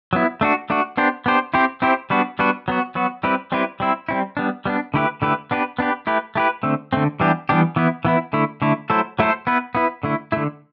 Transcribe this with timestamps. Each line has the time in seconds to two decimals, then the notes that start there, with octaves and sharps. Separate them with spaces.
0.13 F#3 B3 E4
0.41 A3 D4 F#4
0.70 A3 D4 F#4
0.97 B3 D4 G4 C5
1.26 B3 D4 G4 C5
1.54 C4 E4 G4 C5
1.82 C4 E4 G4 C5
2.10 G3 B3 D4 F#4 B4
2.39 G3 B3 D4 F#4 B4
2.68 F#3 B3 F#4
2.95 F#3 B3 F#4
3.23 G3 C4 E4 G4 B4
3.52 G3 C4 E4 G4 B4
3.80 G3 C4 E4
4.09 G3 C4 E4
4.37 G3 B3 D4
4.65 G3 B3 D4
4.94 D3 A3 E4 G4 B4
5.22 D3 A3 E4 G4 B4
5.51 B3 D4 G4 B4
5.79 B3 D4 G4 B4
6.07 A3 E4 G4 B4
6.35 A3 E4 G4 B4
6.63 D3 A3 C4
6.93 D3 A3 C4
7.20 E3 G3 B3 D4 G4
7.49 E3 G3 B3 D4 G4
7.76 E3 B3 E4
8.05 E3 B3 E4
8.33 D3 A3 E4
8.62 D3 A3 E4
8.90 F#3 A3 E4 A4 C5
9.19 F#3 A3 E4 A4 C5
9.47 B3 E4 B4
9.75 B3 E4 B4
10.03 D3 A3 E4
10.32 D3 A3 E4